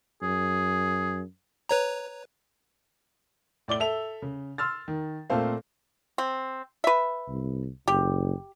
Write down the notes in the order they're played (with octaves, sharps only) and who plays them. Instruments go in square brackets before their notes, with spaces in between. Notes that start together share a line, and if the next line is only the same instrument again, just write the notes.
[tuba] F#2 [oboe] G#4
[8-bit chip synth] B4 C#5 A#5
[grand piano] A2 D5 D6 G7
A4 E5 F7
C#3
C6 E6 F6 A6
D#3
A#2 A3 C4 A4 C5 F5
[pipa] C4
B4 E5
[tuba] C2
[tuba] F#1 [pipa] G4